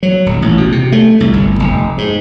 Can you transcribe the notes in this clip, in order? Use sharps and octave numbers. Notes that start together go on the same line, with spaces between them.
F#3
D#1
A1
B2
C3
A3
C2
G1
F1
G#2